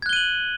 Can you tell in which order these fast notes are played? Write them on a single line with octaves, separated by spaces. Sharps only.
G#6 F#6 G7 D#7 F#7